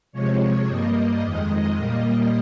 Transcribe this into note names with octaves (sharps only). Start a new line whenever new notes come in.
C3 F3 G#3 C#5
G2 G3 A#3 D#5
F2 D#3 G#3 D#5
A#2 G3 A#3